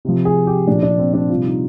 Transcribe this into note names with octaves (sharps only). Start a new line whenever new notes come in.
C3 F3
G#4
G4
A#2 F3 D4
D4
C4
D4
C3 G3 F4
D#4